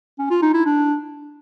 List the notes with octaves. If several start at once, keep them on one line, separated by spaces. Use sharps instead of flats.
C#4
F4
D#4
E4
D4